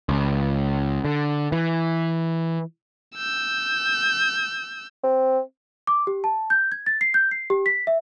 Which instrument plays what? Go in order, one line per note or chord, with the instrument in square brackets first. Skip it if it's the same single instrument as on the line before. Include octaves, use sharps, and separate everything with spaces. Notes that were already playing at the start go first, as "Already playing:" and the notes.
[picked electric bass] C#2
D3
E3
[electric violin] E6 G6
[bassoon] C4
[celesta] D6
G4
A5
G6
G#6
A6
C7
G6
C7
G4
B6
E5